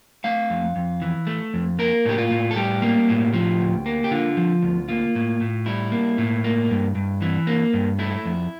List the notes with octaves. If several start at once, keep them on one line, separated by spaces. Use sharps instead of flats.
A3 F5
F2
F2
E3
A3
F2
A#3 A#4
A2 G4
F4
A2
A4
G3 G4
A#3
A2
F3
D2
A#3
G4
D3 F4
F3
D2
A#3 F4
A2
A2
G3 E4
A#3
A2
A#3
G2
G2
E3
A#3
G2
A3 E4
F2